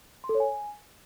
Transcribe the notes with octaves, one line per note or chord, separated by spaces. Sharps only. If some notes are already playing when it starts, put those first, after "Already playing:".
C6
A4
C#5
G#5